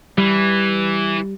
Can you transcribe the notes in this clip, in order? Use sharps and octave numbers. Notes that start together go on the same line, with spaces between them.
E3 G3